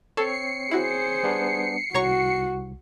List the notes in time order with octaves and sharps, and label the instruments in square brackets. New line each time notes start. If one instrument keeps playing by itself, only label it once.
[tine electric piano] C4 C#5 [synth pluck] A4 [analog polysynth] C7 C#7
[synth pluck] E4 F#4 [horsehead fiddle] G#4 C5
[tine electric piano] G3 B3 D4
[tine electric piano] C2 [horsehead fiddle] F#4 [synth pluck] C#5 A#5 C#6